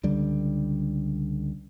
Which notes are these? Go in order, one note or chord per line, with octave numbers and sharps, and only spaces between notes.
C#2 D3 G3